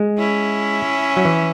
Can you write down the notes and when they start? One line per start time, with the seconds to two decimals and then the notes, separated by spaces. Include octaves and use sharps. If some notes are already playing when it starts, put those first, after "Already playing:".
Already playing: G#3
0.18 C#4 E4
1.17 F#3
1.25 E3